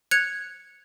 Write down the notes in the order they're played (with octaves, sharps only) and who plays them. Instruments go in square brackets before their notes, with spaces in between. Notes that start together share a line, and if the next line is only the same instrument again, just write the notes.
[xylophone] F#6 G#6 C#7 F7